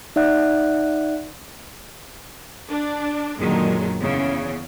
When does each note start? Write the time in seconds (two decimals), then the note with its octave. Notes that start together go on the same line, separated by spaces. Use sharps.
0.16 D#4 D5 E5 F#5 F#6
2.71 D4
3.40 F#2 A#2 D3 D#3 F#3 G#3
4.01 E2 C#3